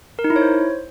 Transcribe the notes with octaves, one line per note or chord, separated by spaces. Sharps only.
A#4
D#4
E4
C#5
C5